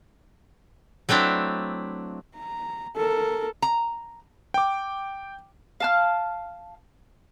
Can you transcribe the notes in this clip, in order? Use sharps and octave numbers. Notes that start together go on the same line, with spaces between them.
F#3 A3 C4 D4 E4
A#5
A4 A#4
A#5
G5 D6
F5 A5 F6